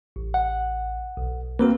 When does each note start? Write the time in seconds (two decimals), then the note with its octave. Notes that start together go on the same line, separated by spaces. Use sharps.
0.16 A1
0.34 F#5
1.17 B1
1.59 A#3 C4 F#4 A#4 B4